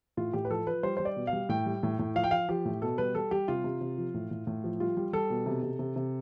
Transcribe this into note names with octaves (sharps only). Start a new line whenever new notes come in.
A2 F4
A2 G4
B4
F3 A4
F3 B4
G3 C5
G3 C5
D5
B2
F5
G3
A2 G5
G3
A2
A2
F3 F5
G5
F3 F5
F3 G4
A2
B2 A4
G3 B4
G3 A4
G3 G4
C3 F4
C3
C3
F3
A2
A2
A2
F3
G3 F4
G3
G3 A4
B2
C3
C3
C3
C3